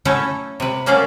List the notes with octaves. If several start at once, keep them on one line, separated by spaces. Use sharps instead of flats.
F#3 A3 C#4 E4 A4
C3 B4
F#3 A#3 C#4 A4 D5 F5